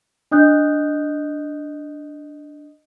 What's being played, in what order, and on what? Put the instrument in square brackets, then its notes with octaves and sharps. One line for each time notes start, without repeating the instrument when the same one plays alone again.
[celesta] D4 D#5 D#6 F#6 G6